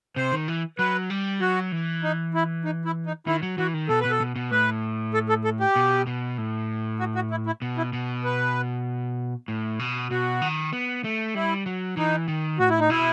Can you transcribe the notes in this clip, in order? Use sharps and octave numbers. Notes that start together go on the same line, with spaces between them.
C3 C5
D#3
E3
F#3 B4
G3
F#3 F#4
E3
D#4
E4
D#4
E4
D#4
D#3 E4
F#3
E3 F#4
D#3
B2 A4
B2 B4
A4
B2
B2
A2 B4
A4
A4
A4
G4
B2
B2
A2
F#4
F#4
E4
E4
B2
E4
B2
B4
A2
B2
B2 F#4
D#3
B3
A3
G3 E4
F#3
E3 D#4
D#3
A2 F#4
E4
D#4
B2 E4